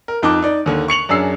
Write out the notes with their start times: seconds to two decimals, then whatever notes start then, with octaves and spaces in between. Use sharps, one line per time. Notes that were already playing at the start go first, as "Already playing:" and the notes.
0.08 A#4
0.22 F2 D#4 A5 D6 F#6
0.42 D#4 D5
0.66 D#2 D3
0.88 C#6 C#7 F7 F#7
1.09 F#2 D4 G#4 E6 C7